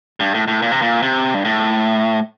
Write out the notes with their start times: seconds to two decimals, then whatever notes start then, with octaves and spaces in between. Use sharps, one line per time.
0.20 G2
0.34 A2
0.48 A2
0.62 A#2
0.71 C3
0.82 A#2
1.02 C3
1.34 G2
1.45 A2